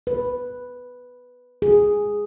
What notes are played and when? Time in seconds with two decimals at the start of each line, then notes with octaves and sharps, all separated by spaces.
0.07 B4
1.62 G#4